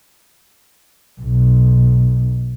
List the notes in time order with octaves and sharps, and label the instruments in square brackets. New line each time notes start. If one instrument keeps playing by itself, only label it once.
[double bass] B1